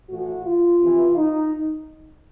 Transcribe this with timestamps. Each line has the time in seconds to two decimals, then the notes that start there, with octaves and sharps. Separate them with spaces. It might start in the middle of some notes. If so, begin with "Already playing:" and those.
0.09 A2 E3 F#4
0.45 F4
0.80 C3 E3
1.16 D#4